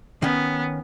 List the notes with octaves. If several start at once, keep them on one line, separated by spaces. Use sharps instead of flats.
D#3 B3 C#4